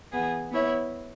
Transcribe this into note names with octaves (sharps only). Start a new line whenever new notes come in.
E3 B3 G#4
B3 E4 C#5 E5